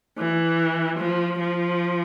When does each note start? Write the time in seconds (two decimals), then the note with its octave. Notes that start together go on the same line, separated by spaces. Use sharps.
0.18 E3
0.99 F3
1.40 F3